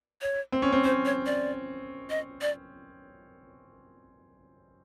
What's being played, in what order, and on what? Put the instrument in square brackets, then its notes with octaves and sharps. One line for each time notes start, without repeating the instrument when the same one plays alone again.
[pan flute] C#5
[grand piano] C4
C#4
C4
[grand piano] C#4 [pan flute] C5
[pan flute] C#5
D5
D#5
D5